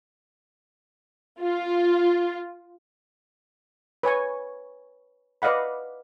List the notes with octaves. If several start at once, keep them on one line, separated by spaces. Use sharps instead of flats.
F4
B4 C#5 G#5 C#6
B4 D5 D#5 F5 F#5 B5